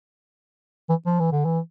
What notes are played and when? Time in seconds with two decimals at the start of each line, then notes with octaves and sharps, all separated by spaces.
0.89 E3
1.06 F3
1.20 E3
1.32 D3
1.45 E3